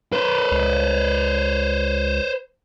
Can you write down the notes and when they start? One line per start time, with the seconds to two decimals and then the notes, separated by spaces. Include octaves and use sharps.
0.12 B4 C5
0.51 C#2